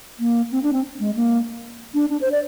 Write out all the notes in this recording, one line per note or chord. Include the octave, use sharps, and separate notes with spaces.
A#3
C4
D4
C4
G#3
A#3
D4
D4
C5
D5